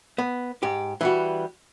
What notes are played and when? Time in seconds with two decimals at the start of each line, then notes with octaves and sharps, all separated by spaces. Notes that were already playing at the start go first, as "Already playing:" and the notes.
0.18 B3
0.63 G#2 G4
1.01 E3 G3 F#4